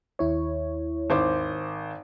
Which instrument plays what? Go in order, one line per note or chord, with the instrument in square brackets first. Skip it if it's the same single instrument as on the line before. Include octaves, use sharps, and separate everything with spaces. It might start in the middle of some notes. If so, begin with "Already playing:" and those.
[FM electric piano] D#2 E4 C#5
[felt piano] G#1 C5 D6